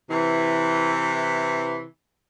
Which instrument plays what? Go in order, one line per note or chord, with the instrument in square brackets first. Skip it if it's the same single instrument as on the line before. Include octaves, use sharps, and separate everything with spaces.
[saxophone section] C3 E3